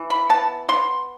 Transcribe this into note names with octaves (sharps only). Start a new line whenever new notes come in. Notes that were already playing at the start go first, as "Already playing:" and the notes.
Already playing: E3
B5
B3 A5
B3 C6